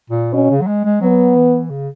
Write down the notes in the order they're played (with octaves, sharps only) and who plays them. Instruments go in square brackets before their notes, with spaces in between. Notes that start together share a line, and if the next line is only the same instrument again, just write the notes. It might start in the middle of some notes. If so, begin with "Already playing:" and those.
[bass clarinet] A#2
[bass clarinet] B2 [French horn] C#4
[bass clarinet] C#3
F#3
G#3
G#3
[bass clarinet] F#3 [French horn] B3
[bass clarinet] E3
C#3